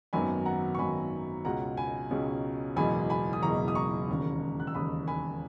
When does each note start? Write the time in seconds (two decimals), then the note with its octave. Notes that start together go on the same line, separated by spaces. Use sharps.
0.13 G#1 F#2 D#3 F#3 B3 G#5 B5
0.46 F#5 A#5
0.75 C#6
0.79 G#1 F#2 D#3 F#3 B3 G#5 B5
1.45 C#2 B2 G#3 C#4 F#5 A#5
1.77 G#5 B5
2.10 C#2 B2 G#3 C#4
2.76 F#1 E2 B2 G#3 G#5 B5
3.10 G#5 B5
3.33 D#6
3.42 F#1 E2 B2 G#3 A#5 C#6
3.68 D#6
3.75 A#5 C#6
4.09 E1 D#2 C#3
4.60 F#6
4.67 E6
4.74 E1 D#2 C#3 B5 D#6
5.07 G#5 B5